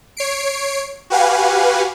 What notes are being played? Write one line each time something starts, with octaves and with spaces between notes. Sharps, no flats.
C#5 C7 D7
F#4 G4 B4 F5 F#5 G#5